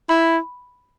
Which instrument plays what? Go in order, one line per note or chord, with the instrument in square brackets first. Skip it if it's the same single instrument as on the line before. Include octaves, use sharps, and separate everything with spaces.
[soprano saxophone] E4 [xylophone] B5